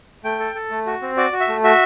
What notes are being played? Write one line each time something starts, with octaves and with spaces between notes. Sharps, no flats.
A3 G5
A4
A4
A3
F#4
C4
F#4 D5
F#4
E5
A3
F#4 E5